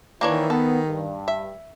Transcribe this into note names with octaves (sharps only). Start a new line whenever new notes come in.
D#3 E3 A#3 D4 C#5
B3 A4
G2
E5